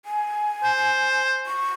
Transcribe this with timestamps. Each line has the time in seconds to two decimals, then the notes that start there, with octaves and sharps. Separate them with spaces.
0.05 G#5
0.64 C5
1.46 C#6